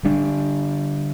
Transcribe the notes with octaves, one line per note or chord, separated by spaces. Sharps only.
D3 G3 D4